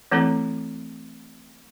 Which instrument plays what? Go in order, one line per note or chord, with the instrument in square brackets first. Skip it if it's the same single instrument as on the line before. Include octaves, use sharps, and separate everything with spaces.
[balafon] E3 A3 C4 E4 A4 A#5